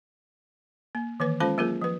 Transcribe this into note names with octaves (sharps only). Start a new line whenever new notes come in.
A#3
D#3 E3 A#3 B4
G#3 C#4 F4 A4 C5 A5
F#3 A#3 F4 G#4 A#4
F3 B4